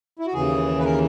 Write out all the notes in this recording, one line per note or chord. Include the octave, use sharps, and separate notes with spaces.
E4
F#4
D#2 C#3 E3 G#4
B4
A#4